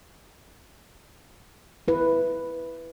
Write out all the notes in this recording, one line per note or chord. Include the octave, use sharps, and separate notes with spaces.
E4 B4